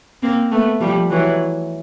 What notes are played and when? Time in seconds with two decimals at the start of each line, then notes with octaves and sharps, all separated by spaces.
0.22 A#3 C4
0.52 A3 B3
0.81 F3 G3
1.10 E3 F#3